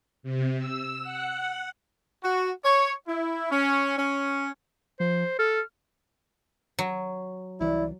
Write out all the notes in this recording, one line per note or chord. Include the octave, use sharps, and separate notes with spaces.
C3
E6
F#5
F#4
C#5
E4
C#4
C#4
F3 C5
A4 F6
F#3
C2 E3 E4 D5